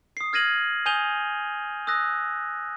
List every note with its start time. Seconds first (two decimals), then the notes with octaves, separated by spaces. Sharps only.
0.17 D#6 C7
0.33 F6 G#6 A#6 D#7 F#7
0.86 G#5 D#6 G6 D#7 F7 G7
1.87 D#6 E6 F#6 A#6